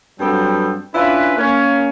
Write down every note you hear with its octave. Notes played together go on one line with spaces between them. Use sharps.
G2 F#3 B3 C4 A4 G5
C#4 D4 E4 F4 B4
A#3 C#4